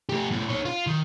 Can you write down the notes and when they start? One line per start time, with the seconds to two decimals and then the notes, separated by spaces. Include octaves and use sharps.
0.09 A3 G4
0.31 A#2 A3
0.49 D#4 C#5
0.65 F4
0.87 D#3